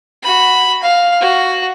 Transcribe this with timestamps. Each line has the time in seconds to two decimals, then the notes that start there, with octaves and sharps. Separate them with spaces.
0.23 F#4 B5
0.83 F5
1.20 F#4